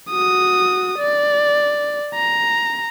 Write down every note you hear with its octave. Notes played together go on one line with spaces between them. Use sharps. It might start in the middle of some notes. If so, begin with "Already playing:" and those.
F#4 D#6
D5
A#5